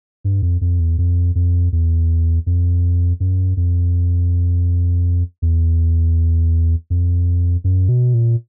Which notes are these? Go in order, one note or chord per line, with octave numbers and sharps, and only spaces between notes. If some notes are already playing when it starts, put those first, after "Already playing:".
G2
F2
F2
E2
F2
F2
E2
F2
F#2
F2
E2
F2
F#2
B2
A#2